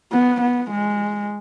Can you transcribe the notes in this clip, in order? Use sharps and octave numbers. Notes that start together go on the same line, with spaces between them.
B3
B3
G#3